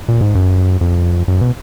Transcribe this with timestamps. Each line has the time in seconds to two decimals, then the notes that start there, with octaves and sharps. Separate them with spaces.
0.08 A#2
0.21 G#2
0.35 F#2
0.81 F2
1.28 F#2
1.41 B2